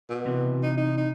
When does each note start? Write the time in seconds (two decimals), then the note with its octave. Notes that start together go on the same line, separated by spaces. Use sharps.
0.10 B2
0.26 C3 E3
0.63 D#4
0.77 D#4
0.97 D#4